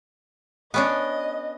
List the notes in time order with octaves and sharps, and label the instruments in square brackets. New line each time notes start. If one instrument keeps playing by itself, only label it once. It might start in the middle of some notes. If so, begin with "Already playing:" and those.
[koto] B3 C#4 D4 [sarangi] D#5